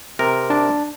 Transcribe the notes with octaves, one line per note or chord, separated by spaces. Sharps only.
C3 A#4
D4 A5